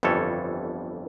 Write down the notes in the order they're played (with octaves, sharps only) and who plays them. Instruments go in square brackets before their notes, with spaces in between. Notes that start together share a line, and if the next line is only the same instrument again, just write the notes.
[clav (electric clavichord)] G1 F2 E3 G3 A4 C#5